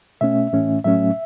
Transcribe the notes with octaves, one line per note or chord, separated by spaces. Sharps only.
B2 A3 C#4 E5
A2 E3 A3 C#4
A2 F#3 A3 C#4 E5